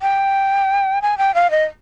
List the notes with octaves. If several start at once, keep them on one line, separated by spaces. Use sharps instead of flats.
G5
G#5
G5
F5
D#5